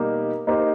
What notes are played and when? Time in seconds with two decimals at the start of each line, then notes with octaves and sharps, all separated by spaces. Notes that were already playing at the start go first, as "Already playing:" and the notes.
Already playing: B2 G3 A#3 D#4 G4
0.47 A#3 D#4 G4 C5